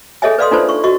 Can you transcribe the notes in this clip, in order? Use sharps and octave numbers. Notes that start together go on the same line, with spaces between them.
G#4 A4 C#5 D#5 E5 G#5
B4 D5 F5 C6 D#6
D4 D#4 F4 A4 B4 C5
C#6
F#4 D#5 C#6